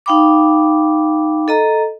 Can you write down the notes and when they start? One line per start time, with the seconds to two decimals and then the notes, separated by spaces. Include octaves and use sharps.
0.06 D#4 F5 G5 B5 D6
1.48 A4 D#5 A#5